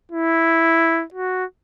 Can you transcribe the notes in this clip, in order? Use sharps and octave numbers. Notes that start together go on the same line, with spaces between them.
E4
F#4